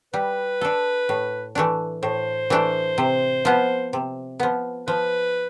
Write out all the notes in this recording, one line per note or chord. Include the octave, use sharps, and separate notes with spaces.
G3 B4
D4 A4
A2
E3 A3 D4
A2 C5
E3 A3 D4
C3
F3 B3
C3
F3 B3
F3 B4